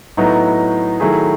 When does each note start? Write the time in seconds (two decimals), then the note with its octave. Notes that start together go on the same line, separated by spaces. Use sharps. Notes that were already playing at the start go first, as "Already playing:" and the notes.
0.17 A2 F#3 B3 D#4
1.00 D#3 F#3 A3 E4 G#4